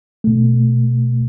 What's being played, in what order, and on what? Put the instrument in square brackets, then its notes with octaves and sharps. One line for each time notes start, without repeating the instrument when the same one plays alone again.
[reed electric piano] B2 A3